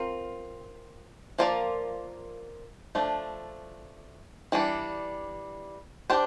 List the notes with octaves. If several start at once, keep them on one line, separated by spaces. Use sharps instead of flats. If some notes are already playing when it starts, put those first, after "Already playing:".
Already playing: C4 F4 A#4
F3 A#3 F4 A#4 D5
F3 A3 D4
E3 G3 D4
D4 G4 C5